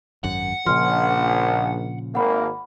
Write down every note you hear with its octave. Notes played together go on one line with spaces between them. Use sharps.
G#1 F#2 F#5
A#1 A#2 C#3 F3 C6 F6
G#1 A#3 F#5 B5